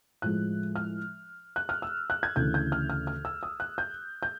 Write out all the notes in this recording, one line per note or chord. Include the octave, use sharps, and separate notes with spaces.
A2 F3 G#3 F#6
F6
F#6
F6
E6
F#6
G#6
D2 C#3 E3 G6
G6
F6
F6
F6
E6
D#6
F#6
G6
G6